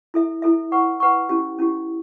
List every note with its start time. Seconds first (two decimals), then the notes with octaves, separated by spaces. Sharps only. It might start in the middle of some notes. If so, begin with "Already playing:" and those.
0.14 E4 A4 E5
0.42 E4 A4 E5
0.72 B4 F#5 C#6
1.00 B4 F#5 C#6
1.29 C#4 E4 G4
1.59 C#4 E4 G4